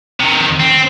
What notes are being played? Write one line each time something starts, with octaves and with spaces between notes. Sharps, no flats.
C3 D#3
C4